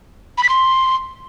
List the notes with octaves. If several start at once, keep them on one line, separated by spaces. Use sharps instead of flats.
B5
B6
C6